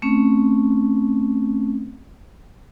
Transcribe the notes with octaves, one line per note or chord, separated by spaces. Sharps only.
A3 C4 C#4